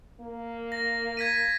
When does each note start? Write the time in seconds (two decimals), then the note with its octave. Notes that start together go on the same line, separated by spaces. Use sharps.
0.21 A#3
0.72 A#6
1.17 G#6 B6 D#7